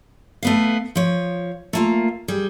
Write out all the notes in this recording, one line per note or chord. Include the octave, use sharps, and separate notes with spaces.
A3 B3 F5
F3 C#5
A3 A#3 F4
G3 G#4